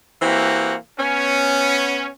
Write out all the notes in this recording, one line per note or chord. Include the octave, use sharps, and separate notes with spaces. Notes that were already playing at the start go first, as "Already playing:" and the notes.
E3 A#3 C4 F#4 G4
B3 C#4